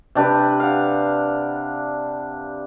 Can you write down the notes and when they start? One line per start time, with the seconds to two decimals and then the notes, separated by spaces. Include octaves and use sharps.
0.15 C3 D4 G4 B4
0.60 F5 F#5